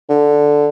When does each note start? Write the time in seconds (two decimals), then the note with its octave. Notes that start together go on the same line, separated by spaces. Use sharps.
0.10 D3